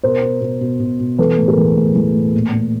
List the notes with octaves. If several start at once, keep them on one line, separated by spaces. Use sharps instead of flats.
B2 A#4 C5
B2
B2
B2
B2
B2
E3 A4 B4
A2
G#4 A#4
E3
A2
E3
A2
A#2
A#2